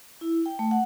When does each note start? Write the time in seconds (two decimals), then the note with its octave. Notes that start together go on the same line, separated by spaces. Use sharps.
0.21 E4
0.46 G5
0.59 A3
0.71 F#5